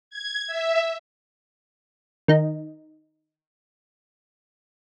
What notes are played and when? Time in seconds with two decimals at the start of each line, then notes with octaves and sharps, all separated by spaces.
0.10 G#6
0.47 E5
2.28 D#3 D#4